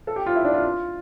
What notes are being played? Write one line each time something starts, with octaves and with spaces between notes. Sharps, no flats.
A4
G4
F4
E4
D4
F4
F4